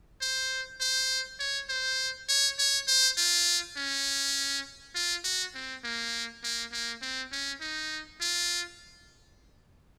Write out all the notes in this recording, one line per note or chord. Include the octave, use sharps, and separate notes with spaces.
C5
C5
C#5
C5
C#5
C#5
C5
F4
C#4
F4
F#4
C4
A#3
A#3
A#3
C4
C#4
D#4
F4